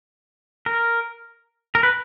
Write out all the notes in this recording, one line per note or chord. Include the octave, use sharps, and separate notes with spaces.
A#4
A#4
B4